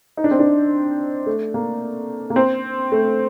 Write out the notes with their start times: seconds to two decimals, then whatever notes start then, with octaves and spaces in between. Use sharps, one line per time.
0.17 D#4
0.24 D4
0.31 C4
0.39 D4
1.26 A3
1.54 A#3
2.30 A#3
2.36 C4
2.92 A3